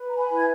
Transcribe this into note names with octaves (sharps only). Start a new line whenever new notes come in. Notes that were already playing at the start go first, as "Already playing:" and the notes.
Already playing: B4
A#5
G#5 B5
E4
G#6